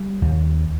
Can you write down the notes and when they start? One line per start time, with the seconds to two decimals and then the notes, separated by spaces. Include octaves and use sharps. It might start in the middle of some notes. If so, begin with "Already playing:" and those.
Already playing: G3
0.22 D#2